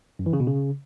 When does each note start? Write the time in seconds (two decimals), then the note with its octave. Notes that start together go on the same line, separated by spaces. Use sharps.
0.19 F#2
0.26 E3
0.33 C#3
0.40 B2
0.47 C#3